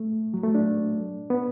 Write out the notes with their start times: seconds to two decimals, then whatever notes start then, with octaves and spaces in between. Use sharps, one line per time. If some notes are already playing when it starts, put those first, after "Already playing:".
Already playing: A3
0.34 F#3
0.44 A3
0.55 D4
1.30 B3